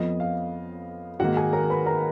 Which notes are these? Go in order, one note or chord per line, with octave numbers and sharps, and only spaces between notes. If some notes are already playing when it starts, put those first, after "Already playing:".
Already playing: F2 F3 B3 D#5
F5
G#2 D#3 A#3 F#4 F#5
G#4 G#5
A#4 A#5
B4 B5
A#4 A#5